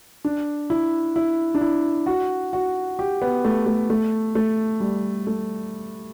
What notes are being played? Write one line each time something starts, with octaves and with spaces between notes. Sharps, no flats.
D4
E4
E4
D4
E4
F#4
F#4
G4
B3
A3
A3
A3
A3
G3
A3